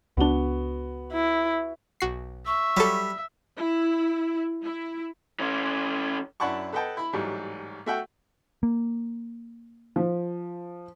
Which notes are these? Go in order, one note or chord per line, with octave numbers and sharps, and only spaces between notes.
C#2 B3 D4 F#4 G7
E4
B1 F#4 C7
E5 C#6
F#3 G3 A4
E4
E4
E3 C#4
F#2 D4 E4 F#5 A5 C#6
A4 B4 D#5 F#5 G5 A5
E4 B5
A1 G#2 F#3 G3
A3 F#4 E5 F#5 G5
A#3
F3